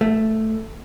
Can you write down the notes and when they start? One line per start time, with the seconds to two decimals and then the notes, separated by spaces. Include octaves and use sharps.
0.01 A3